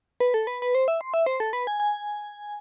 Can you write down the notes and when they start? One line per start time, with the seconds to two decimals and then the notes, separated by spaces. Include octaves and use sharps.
0.20 B4
0.34 A4
0.47 B4
0.62 B4
0.75 C5
0.88 E5
1.01 C6
1.14 E5
1.26 C5
1.40 A4
1.53 B4
1.67 G#5
1.80 G#5